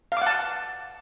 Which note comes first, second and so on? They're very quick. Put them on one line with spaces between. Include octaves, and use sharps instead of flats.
F5 D6 F#5 A5